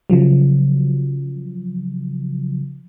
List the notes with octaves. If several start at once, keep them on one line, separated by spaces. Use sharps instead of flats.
C#3 F3 F#3